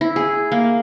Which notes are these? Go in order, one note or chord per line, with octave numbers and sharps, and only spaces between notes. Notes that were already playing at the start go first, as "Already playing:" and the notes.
E4
G#4
A#3